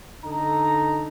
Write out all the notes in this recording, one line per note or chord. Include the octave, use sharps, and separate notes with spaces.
D3 D#4 A4 A#5